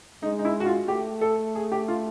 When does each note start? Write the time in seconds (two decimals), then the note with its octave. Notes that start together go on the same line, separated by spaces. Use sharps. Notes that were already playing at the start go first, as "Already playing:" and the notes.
0.23 G#3 D#4
0.39 D#4
0.45 E4
0.60 F#4
0.66 F4
0.88 A3 G4
1.21 A4
1.55 G#4
1.72 G4
1.88 F4